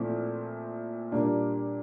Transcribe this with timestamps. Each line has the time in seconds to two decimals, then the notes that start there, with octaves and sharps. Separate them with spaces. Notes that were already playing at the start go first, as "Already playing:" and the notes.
Already playing: A#2 F3 A3 C4 E4
1.12 A#2 G3 A#3 D4